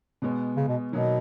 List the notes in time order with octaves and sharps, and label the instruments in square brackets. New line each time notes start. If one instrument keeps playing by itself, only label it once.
[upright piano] B2 G#3 B3
[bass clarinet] C#3
B2
[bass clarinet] B2 [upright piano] D#3 F#3 A#3 D#4